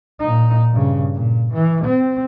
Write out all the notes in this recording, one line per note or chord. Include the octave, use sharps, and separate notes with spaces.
A#2 D#4
G2 C#3
A#2
E3
C4